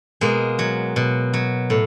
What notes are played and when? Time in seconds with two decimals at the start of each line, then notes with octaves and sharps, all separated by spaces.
0.21 B2 G#3 A#3
0.59 F#3
0.96 B2
1.33 F#3
1.70 A2